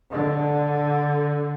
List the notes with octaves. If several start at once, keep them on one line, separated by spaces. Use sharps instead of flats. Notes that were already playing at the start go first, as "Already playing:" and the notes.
D3